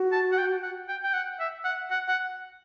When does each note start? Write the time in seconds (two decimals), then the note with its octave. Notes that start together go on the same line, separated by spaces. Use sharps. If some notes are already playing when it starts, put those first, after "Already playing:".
Already playing: F#4
0.12 A5
0.32 F#5
0.38 G5
0.63 F#5
0.88 G5
1.04 G5
1.13 F#5
1.40 E5
1.64 F#5
1.90 F#5
2.08 F#5